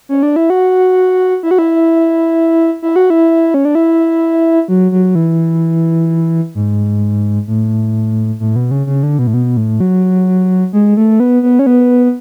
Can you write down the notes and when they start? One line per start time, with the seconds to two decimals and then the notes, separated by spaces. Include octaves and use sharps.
0.09 C#4
0.23 D4
0.36 E4
0.50 F#4
1.43 E4
1.51 F#4
1.59 E4
2.82 E4
2.96 F#4
3.10 E4
3.54 C#4
3.65 D4
3.75 E4
4.68 F#3
4.92 F#3
5.15 E3
6.55 G#2
7.48 A2
8.40 A2
8.56 B2
8.71 C#3
8.87 C#3
9.03 D3
9.19 B2
9.27 A2
9.34 B2
9.57 A2
9.80 F#3
10.73 G#3
10.97 A3
11.20 B3
11.43 B3
11.59 C#4
11.66 B3